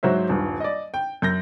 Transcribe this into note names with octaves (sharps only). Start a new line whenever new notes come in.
G#2 F#3 F#4 C5 E5
D#1 G2
D5 D#5
G5
F#2 G6 A#6